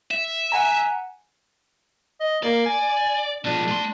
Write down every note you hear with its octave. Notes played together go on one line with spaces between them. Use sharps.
E5
F#5 G#5 A#5
D#5
A#3 D5
G#5
B2 F3 D4
A3 C6